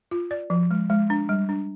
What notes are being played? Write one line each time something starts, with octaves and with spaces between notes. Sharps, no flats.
F4
D5
F3
G#3
G#3
D4
G3
D4